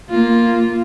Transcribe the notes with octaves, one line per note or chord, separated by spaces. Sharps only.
A#3 F4